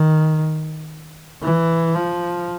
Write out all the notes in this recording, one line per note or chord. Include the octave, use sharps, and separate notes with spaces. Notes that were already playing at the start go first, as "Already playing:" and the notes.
Already playing: D#3
E3
F3